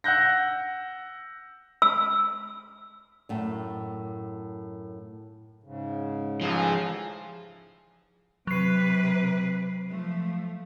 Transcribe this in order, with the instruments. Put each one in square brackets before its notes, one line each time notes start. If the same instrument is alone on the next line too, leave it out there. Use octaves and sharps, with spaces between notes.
[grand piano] F#5 E6 F#6 G6 A#6
[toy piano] E6
[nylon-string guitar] F#2 A2
[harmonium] G#2 C#3
[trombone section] A1 G#4 [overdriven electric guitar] F3
[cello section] C3 B4 [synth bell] F#3 C7
[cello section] F3 A3